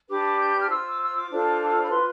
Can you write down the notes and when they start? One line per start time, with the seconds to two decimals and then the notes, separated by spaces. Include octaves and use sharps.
0.09 D4 G4 B4 D6
0.23 D6
0.38 G6
0.49 G6
0.60 F6
0.69 F4 C5 E6
0.89 D6
0.99 E6
1.15 D6
1.30 D4 F4 A4 C5
1.82 B5
1.90 F4 B4 C6